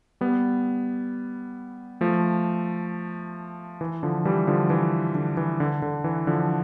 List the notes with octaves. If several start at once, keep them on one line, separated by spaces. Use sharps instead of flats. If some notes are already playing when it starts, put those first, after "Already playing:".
G3 B3
F3 A3
E3
D3 F3
E3 G3
D3 F3
E3
D3
E3
D3
D3
E3
D3 F3